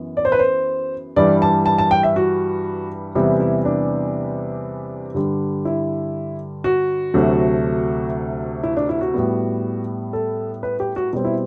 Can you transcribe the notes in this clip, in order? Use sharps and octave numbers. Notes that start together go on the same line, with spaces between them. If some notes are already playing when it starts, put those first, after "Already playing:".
Already playing: F#2 E3 B3
D5
C5
B4
C5
G2 E3 G3 D5
A5
A5
A5
G5
E5
F#4
E2 C3 E3 G3 B3 E4
E4
D4
G2 D3 G3
E4
F#4
D2 C3 F#3 A3
E4
D4
E4
F#4
A2 G3 B3
A4
B4
G4
F#4
B2 G3 C4
E4